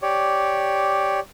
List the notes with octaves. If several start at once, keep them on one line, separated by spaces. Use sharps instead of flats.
G4 C#5 D5